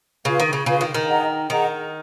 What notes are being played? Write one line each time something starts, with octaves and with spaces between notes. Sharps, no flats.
C#3 F4 B4 F5
D#3
C#3
C#3 F4 B4 F5
D#3
D#3
G#4 D#5 F#5 A#5
D#3 G#4 D#5 F#5 A#5